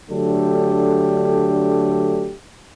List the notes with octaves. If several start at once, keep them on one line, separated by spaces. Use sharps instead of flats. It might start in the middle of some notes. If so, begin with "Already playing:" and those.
D3 F#3 A3 D4 G4 A4